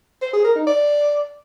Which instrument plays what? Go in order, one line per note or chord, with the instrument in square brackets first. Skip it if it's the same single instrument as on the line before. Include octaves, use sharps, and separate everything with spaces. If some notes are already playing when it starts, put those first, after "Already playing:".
[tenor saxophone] C5
G#4
A#4
D#4
D5